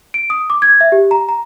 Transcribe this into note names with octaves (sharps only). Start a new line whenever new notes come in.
D7
D#6
D6
G#6
E5
G4
A#5
A#5